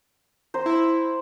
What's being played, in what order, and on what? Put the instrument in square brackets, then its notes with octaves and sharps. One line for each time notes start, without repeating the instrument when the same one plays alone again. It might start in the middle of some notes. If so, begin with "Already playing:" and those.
[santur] C5 A#5 C6
[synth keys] E4